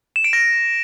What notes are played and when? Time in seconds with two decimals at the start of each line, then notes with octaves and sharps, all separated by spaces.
0.16 E7
0.24 D7
0.33 A#6